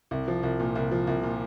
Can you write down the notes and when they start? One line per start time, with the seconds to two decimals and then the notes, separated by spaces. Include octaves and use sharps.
0.11 C2
0.28 F3
0.43 C2
0.60 A#2
0.75 C2
0.91 F3
1.07 C2
1.23 A#2